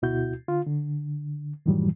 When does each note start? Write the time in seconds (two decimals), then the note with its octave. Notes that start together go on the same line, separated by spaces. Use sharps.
0.02 D2 B2 E4 F#4 G6
0.48 D3 F4
0.67 D3
1.66 F#2 A2 D#3 E3 F#3 G3